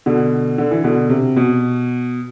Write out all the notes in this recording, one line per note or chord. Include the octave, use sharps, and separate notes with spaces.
B2 D3
D3
E3
B2 D3
C3
B2